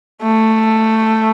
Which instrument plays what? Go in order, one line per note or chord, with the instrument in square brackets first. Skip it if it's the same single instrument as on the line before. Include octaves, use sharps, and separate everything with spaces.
[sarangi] A3